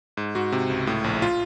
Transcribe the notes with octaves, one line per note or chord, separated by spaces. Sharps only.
G#2
G#2 F#4
C3
C#2
A2
A#1
F4